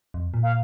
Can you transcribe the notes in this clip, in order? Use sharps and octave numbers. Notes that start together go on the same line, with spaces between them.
F2
A#2
F5